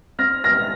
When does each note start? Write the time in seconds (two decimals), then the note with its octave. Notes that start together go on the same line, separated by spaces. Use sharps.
0.19 C4 F6 A#6
0.44 F6 A#6